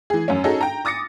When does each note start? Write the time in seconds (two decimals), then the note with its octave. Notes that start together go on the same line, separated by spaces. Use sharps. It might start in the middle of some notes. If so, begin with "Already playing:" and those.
0.10 E3 G#4
0.28 F#2 C#4
0.44 C#4 D#4 F#4 G#4 A4
0.61 G5 A#5
0.85 D6 D#6 A6 A#6 C#7